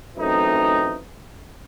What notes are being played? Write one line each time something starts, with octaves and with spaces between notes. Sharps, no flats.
F#2 E3 A3 C4 D#4